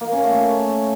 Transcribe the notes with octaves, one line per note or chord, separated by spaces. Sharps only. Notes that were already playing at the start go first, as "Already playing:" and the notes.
A#3
C#4
A3